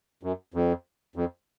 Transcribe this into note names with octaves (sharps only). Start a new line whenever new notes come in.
F#2
F2
F2